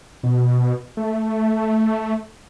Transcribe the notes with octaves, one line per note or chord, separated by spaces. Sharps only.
B2
A3